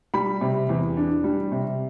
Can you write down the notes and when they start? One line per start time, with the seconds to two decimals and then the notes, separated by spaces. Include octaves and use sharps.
0.14 G3 B5
0.41 C3
0.69 E2
0.97 D4
1.24 G3
1.52 C3